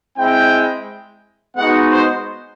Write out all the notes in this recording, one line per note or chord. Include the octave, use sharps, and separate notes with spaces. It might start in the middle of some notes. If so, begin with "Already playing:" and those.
G#3 C4 E4 G5
G#3 B3 D#4 F#4 F#5
C5